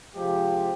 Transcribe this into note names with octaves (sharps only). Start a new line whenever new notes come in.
C3 F3 G#3 G4